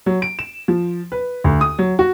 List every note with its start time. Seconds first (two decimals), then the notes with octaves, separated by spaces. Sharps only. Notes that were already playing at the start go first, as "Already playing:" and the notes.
0.06 F#3
0.22 D7
0.39 E7
0.68 F3
1.12 B4
1.44 D2
1.61 D#6
1.79 F#3
1.99 F#4